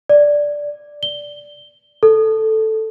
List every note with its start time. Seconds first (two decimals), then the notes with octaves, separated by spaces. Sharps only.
0.09 D5
1.03 G7
2.03 A4